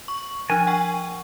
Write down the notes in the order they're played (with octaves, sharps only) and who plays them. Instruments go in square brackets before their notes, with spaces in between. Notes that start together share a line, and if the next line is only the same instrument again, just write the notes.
[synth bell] C#6
[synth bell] F3 D4 [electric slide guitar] G#5
[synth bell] F#5 G5 C#6